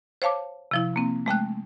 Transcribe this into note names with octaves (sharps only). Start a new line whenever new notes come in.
C5 C#5 F5 A5 D6
C3 F3 E4
A#3 C4
G#3 A3 G5 F#6